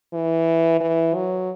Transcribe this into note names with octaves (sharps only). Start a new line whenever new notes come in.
E3
E3
F#3